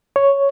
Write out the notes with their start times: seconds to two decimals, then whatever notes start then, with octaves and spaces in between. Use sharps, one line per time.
0.16 C#5